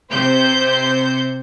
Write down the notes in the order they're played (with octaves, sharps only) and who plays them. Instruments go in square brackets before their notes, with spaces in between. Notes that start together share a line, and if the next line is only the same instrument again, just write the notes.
[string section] C3 C5 G6